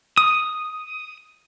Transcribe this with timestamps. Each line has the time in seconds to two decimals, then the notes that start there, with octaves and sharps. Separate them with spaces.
0.18 D#6